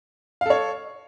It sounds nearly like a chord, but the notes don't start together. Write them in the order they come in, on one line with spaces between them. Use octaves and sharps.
F5 A4 C#5